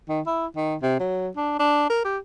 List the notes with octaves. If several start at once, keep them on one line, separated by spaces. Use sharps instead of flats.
D#3
E4
D#3
C3
F#3
D4
D4
A#4
G4